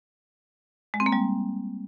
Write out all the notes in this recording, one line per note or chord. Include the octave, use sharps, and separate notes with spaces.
G#3
C4
A#3
G3